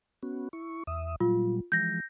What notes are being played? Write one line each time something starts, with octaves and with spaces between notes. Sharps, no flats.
B3 C#4 F#4
E4 C#6
E2 E5 D#6
A#2 F#3 G3 F4
E3 F3 G#3 G6 A#6